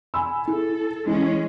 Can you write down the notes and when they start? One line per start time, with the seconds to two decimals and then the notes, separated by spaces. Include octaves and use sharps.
0.14 G#5 B5 E6
0.47 E4 G#4 A4
1.07 E3 G#3 C#4